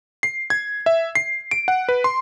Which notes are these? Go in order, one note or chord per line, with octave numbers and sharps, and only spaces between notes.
C7
G#6
E5
C7
D7
F#5
B4
C6